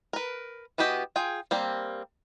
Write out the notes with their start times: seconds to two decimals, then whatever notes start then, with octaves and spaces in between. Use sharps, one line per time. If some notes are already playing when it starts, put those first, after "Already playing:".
0.13 A#4 B4
0.78 E3 B3 F#4 G4 D#5
1.16 F4 G#4 G5
1.51 G3 A#3 C4